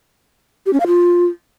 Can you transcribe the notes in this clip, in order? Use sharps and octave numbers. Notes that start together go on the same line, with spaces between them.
G4
C#4
F5
F4